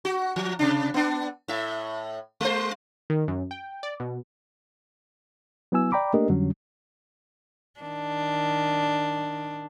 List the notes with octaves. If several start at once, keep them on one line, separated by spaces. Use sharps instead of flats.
F#4
F3
C3 D4
B3 D4
A2 E5
G#3 C5
D#3
F#2
G5
D5
B2
F#3 B3 E4 G#5 E6
D5 G5 A#5 B5 D6
A3 A#3 D4 G4 A#4 D#5
F2 D3 F#3 G3 C#4
D#3 D4